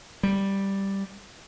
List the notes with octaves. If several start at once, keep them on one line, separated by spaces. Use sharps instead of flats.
G3